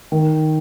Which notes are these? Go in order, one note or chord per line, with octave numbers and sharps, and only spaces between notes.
D#3